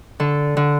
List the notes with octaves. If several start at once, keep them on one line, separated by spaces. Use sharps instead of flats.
D3 A4
D3